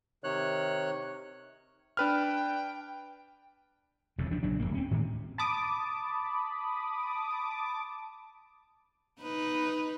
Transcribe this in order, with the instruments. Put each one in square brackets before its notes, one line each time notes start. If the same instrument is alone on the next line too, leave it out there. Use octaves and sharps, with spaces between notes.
[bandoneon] C3 D#3 C#5 F#6
[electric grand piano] D4 B4 F6 [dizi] G5
[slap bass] E1 C2 F2 C#3
F3 D4
A#1 C#3 F#3 D4
D1 G#1 A#3
C4 C#4
A2 D#3 E3 G#3
[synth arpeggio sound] A5 B5 D6 D#6
[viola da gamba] D#4 B4